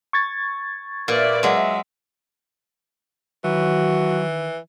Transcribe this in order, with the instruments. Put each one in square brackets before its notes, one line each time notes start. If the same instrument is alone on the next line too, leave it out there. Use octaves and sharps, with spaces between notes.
[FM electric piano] C#6 G#6 A6
[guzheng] A#2 [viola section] B4 D5 E5
[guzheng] F#3 G#3 [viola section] E5
[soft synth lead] D#3 [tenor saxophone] E3 [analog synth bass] F#3 [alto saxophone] F#4